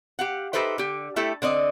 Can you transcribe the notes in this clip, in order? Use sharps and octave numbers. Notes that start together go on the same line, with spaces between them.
G4 F5 F#5
D#4 G4 A4 B4 C5 E5
D3 G4
A3 E4 G4 A4 E5
D3 C4 D5 D#5